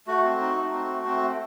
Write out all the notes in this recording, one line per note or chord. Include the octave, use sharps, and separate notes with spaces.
A3 F#4
C4
D#4
A3
C4
A3
C4
A3